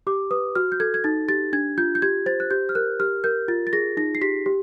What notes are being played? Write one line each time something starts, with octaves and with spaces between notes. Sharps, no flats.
G4 D6
B4 D#6
F#4 F6
G6
A4 G#6
G#6
D#4 A6
G4 A6
D4 G#6
F4 G6
G6
G4 G#6
C5 A6
F#6
G4 G6
F6
A#4 F#6
G4 F6
A#4 G6
F4 A6
A6
G#4 A#6
D#4 A#6
C7
G4 B6
G4